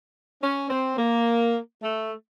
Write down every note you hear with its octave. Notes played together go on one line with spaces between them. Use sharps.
C#4
C4
A#3
A3